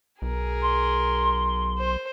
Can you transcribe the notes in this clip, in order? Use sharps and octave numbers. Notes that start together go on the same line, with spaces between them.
B1 G#4 A#4
C6
C5